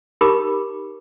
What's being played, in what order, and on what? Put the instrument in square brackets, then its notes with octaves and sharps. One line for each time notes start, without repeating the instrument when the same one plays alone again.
[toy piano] D#4 G4 A#4 B5 D6